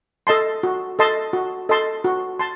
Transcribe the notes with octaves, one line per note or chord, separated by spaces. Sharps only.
A4 D#5 A5 C6
F#4
A4 D#5 A5 C6
F#4
A4 D#5 A5 C6
F#4
A5 C6